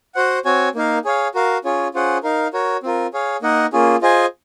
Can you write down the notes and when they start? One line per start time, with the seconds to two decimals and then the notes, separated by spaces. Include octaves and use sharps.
0.15 F#4 C5 F#5
0.45 C4 F#4 C#5 G#5
0.75 A#3 D#4 A#4 F5
1.04 G#4 C#5 F5
1.34 F#4 A#4 F5
1.64 C#4 F4 G#4 C#5
1.94 C#4 F4 G#4 C5 F#5
2.23 D#4 A#4 F5
2.53 F#4 A#4 C#5
2.83 C4 F4 A#4
3.13 G#4 C#5 F5
3.42 A#3 D#4 A#4 D#5 F#5
3.73 A#3 C#4 F4 G#4
4.02 F4 G#4 C5 D#5 G#5